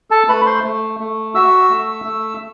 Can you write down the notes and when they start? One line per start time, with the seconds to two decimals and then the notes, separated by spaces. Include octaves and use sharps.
0.11 A4 A5
0.29 A3 B4 B5
0.46 C5 C6
0.64 A3
1.00 A3
1.35 F#4 E5 E6
1.69 A3
2.05 A3